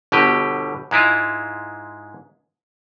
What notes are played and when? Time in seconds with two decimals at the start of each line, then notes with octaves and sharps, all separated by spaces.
0.12 G1 B2 D3 G4 D#5
0.91 G#2 G#3 E4 F4